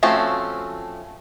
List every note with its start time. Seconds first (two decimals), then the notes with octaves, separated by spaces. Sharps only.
0.03 F3 A3 C4 C#4 F#4